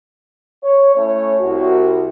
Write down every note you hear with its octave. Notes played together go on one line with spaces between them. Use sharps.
C#5
A3 C#4 E4 C#5
C2 F#4